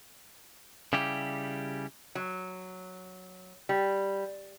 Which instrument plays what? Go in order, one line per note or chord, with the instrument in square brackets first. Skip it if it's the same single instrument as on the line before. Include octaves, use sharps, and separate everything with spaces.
[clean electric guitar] C#3 G3 E4 G4
[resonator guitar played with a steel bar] F#3
G3